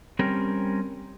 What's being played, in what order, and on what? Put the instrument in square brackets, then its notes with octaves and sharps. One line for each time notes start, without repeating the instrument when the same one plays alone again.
[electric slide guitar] G3 C4 C#4 A#4